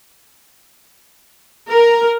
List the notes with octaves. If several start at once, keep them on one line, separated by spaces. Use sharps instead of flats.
A#4